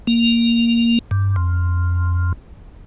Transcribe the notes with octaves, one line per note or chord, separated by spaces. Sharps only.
A#3
G2
F2